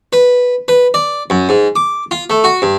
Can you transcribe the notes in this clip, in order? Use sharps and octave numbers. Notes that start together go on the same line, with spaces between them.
B4
B4
D5
F#2
G#2
D6
F4
A3
F#4
G2